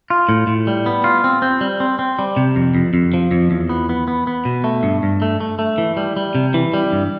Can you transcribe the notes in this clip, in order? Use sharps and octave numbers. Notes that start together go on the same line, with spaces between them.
F4
A2
A2
G3
B3
F4
C4
C4
G3
C4
C4
G3
C3
F2
F2
F2
F3
F2
E2
B3
B3
B3
B3
B2
A3
G2
G2
A3
A3
A3
E3
G3
G3
C3
E3
G3
G2